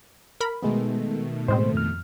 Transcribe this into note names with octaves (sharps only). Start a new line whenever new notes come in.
A#4 B5
B2 D#3 G#3 A3 B3
A2 G#3 C4 C5
F2 F6